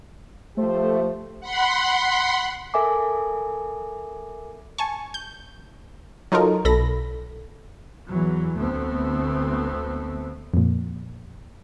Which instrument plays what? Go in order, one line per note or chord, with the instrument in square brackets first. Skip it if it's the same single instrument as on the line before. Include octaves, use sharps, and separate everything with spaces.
[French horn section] F3 G4 C5 [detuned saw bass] A3
[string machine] F#5 B5 C6
[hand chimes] A4 A#4 E5 G#5 D6
[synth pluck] G#5 A5 C#6
G6
F#3 D#4 F4 A4 A#4
B1 A4 B5 A#6
[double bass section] E2 E3 F#3
D2 A3 B3 C4
[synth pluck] F2 A#2